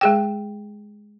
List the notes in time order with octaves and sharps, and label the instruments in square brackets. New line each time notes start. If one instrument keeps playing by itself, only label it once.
[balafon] G#3 G#4 G5